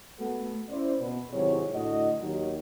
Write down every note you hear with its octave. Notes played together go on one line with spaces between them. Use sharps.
A3 B3 F#4 A4
C#4 E4 C5 D5
B2 B4
G#1 C3 F#3 E4 G#4 C#5
A2 D3 F#4 D#5
D#2 D#3 F#3